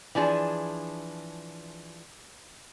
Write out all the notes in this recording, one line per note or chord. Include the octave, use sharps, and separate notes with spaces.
E3 F3 D4 G#4